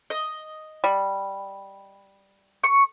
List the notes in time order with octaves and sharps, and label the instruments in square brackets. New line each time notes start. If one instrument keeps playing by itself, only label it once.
[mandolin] D#5
[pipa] G3
[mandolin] C#6